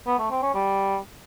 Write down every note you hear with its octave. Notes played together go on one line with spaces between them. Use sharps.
B3
A3
C4
C#4
G3